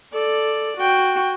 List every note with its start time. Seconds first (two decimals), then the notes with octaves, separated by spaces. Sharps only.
0.13 A4 D5
0.77 F#4 G5